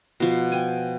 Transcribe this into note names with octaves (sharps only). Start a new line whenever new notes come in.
B2 F3
G5 G#5